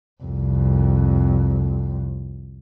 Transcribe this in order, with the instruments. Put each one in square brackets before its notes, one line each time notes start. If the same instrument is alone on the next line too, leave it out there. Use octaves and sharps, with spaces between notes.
[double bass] C2 F2